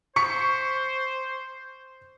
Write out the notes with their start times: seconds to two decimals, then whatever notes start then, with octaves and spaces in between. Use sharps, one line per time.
0.16 C5 C#6 B6 C#7